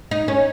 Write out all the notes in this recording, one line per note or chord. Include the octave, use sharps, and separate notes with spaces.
D#4
C#4